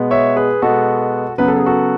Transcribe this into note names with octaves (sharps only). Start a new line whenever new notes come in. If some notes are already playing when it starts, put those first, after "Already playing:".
Already playing: B2 G#3 B3
C#5 E5
G#4 B4
B2 G#3 B3 F#4 A4
C#3 F#3 B3 B4
A4
G#4
F#4 A4